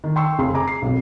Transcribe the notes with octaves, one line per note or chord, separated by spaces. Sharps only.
D#3
G5 C6 C#6 E6
F1 C#3 C6
G#4 A#5 D6
C7
B1 F2